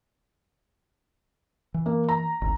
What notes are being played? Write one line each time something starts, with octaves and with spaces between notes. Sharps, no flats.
E3
A#3
A#5
G#1 D2